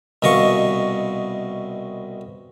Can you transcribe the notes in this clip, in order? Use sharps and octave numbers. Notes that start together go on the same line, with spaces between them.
C2 B2 D#5 F5 C#6